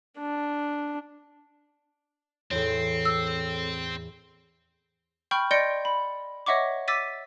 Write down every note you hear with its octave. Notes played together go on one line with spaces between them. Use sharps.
D4
E2 A2 C4 A4 C#5
E6
G5 B5 C#6 F6 G6
D5 D#5 C6 G6 C#7 D7
B5
C#5 D#5 E5 F#5 C#6 D6
D6 E6 A6 B6 D#7